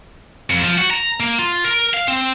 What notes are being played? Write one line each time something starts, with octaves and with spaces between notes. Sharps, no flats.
F2
F3
F#4
A#5
A#3
F4
A#4
F5
C4